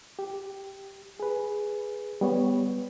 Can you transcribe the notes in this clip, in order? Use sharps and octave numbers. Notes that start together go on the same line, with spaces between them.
G4
G#4 B4
G3 B3 C#5